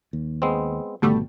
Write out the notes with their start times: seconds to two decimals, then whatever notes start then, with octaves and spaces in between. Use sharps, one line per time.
0.13 D#2
0.42 G#3 B3 C4
1.02 G#1 B2 D3 G3 A3